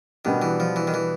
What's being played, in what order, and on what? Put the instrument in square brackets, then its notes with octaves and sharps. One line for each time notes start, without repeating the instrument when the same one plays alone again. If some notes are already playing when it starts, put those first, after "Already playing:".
[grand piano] B2 G3 B3 D4 G4 [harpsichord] D#3
[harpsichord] E3
F3
E3
D#3
E3